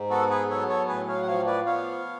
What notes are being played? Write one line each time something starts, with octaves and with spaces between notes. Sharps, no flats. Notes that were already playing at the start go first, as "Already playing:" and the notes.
Already playing: G#2
B3 F#4 A4
G#4 B4
F#3 A4 C#5
A4 C#5
A2 G#4 B4
C#5 F5
F#5
F3 C#5 F5
B4 D5
B3 C#5 F5